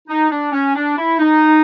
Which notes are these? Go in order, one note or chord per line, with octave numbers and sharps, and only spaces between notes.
D#4
D4
C#4
D4
E4
D#4